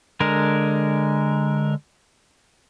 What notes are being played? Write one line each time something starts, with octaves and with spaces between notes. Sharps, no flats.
D3 G#3 A#4